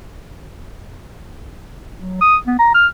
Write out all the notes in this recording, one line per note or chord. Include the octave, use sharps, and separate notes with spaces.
F#3
D#6
B3
A#5
F6